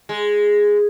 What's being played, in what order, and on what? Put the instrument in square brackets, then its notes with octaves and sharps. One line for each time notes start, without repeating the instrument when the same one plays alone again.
[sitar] G#3